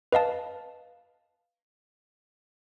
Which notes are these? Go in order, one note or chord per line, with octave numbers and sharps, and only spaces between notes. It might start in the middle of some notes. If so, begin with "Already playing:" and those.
B4 D#5 F5 A5